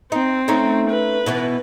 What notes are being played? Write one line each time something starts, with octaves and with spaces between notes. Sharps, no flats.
C4 D#4
A3 C#4 D#4
B4
B2 E3 B3